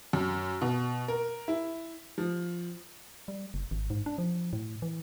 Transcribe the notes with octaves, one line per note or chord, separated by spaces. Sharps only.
F#2
B2
A#4
E4
F3
G3
F#1
G#1
G#2
D4
F3
A2
E3